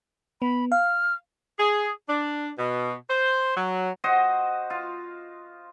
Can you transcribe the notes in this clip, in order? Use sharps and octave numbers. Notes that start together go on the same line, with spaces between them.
B3 B5
F5 F6
G#4
D4
B2
C5
F#3
F#4 C5 D#5
F4